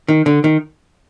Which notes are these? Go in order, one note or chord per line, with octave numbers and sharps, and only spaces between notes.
D#3
D3
D#3